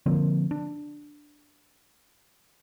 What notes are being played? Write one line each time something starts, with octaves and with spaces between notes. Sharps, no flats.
D3 F3 A#3 C4
D4